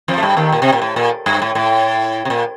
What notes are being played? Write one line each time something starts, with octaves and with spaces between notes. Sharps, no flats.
F2 F3
A3
G2 G3
D#2 D#3
A#2
C3
A#2
A2
A#2
G2
A2
A2
C3
A#2